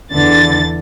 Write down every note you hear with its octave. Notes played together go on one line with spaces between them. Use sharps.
E2 D3 E3 A6